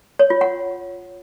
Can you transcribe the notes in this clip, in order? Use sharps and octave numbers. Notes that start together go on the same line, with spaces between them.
C#5
F4
F#5